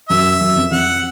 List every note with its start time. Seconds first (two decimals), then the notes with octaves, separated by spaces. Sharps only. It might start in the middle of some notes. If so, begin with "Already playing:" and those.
0.09 F#2 E5
0.41 F#2
0.56 F2
0.71 F2 F#5